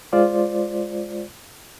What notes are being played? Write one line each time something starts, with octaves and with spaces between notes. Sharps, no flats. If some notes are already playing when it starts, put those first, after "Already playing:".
G#3 F4 C5 D5